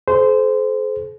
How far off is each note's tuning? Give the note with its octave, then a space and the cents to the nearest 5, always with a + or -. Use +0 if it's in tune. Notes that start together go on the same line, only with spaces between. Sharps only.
A4 -45 C5 -20